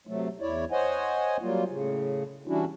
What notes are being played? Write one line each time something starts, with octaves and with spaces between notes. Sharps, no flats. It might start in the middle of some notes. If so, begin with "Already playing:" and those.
C3 F#3 A3
E2 E4 C#5 D5
C5 C#5 D#5 F#5 G#5
F#3 G3 A#3 F4
A2 C#3
E3 G3 C#4 D4 E4 F#4